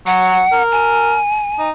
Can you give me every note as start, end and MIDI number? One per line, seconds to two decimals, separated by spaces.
0.06 0.42 54
0.06 0.63 78
0.52 1.17 70
0.72 1.68 80
1.59 1.71 63